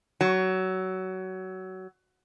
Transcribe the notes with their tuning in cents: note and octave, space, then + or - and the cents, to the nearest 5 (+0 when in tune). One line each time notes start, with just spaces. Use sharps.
F#3 +20